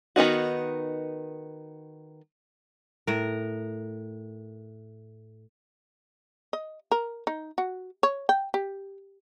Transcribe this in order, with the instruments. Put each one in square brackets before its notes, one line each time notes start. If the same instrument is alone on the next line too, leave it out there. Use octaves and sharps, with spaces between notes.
[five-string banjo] D#3 B3 D#4 F#4
[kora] A2 A#4
[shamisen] D#5
A#4
D#4
F#4
C#5
G5
G4